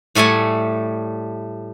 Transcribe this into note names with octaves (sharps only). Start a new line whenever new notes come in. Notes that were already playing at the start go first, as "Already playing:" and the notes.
A2 G3 A3 F#5 G#5